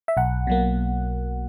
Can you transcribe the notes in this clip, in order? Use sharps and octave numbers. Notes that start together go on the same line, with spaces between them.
E5
B1 F#5
B2 F#3 A#3